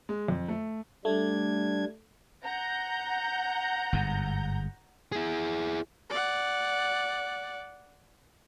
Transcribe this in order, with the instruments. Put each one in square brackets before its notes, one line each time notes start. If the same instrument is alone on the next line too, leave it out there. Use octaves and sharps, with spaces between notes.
[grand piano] G#3
F2
A3
[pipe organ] G3 D4 G#6 [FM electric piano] A3
[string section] F#5 A#5 G6
[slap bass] G1 G#2
[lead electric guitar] E4 G#4
[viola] D5 F#5